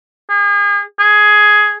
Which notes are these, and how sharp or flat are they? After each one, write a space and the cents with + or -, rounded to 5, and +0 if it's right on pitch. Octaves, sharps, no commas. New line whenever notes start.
G#4 -35
G#4 +10